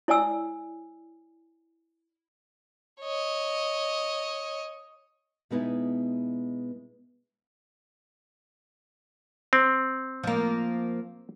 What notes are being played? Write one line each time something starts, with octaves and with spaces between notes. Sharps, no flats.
E4 C#5 D5 G#5 E6
C#5 D#5
B2 G#3 B3 D#4 E4
C4
F3 A#3